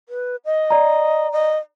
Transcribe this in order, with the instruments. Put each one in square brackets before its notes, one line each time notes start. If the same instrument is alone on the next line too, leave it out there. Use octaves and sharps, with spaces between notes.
[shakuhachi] B4
D#5
[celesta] D5 A#5
[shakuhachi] D#5